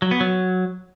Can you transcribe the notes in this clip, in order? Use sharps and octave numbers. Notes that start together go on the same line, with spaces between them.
F#3
B3
F#3